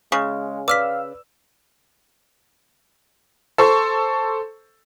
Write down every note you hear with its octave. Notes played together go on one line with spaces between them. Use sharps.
C#3 G#3 C#6
B4 D5 F5 D6 E6 F6 B6
A4 C5 C#6